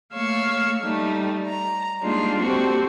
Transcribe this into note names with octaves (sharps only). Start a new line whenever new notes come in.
A3 A#3 C#5 F5 C#6 E6
G3 A3 D#4
A#5
G3 G#3 A#3 D4 D#4 F4
A#3 C4 F#4 G4 A4 C5